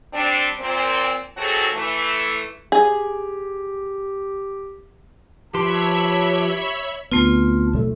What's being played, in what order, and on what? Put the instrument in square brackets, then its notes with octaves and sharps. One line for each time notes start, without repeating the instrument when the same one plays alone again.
[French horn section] G3 C4 D4
A#2 C4
D#2 F#3 C4 F#4 G#4 A4
E3 A3
[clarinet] G4 [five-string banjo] G#4
[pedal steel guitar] F3 B4 C6 [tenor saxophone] G4 [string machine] C#5 E5 B5 [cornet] A5
[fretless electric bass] D2 B3 [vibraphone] A3 C4 F4
[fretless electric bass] B1 F3 A3